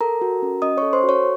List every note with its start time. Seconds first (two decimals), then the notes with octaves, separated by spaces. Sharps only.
0.01 A4 A#4 A#5
0.22 F#4
0.42 C#4
0.62 C#4 D#5 D#6
0.77 A4 C#5 C#6
0.93 C5 C6
1.03 F#4
1.09 C#5 C#6